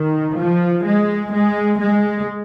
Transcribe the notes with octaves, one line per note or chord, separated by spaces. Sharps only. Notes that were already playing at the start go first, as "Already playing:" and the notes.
Already playing: D#3
F3
G#3
G#3
G#3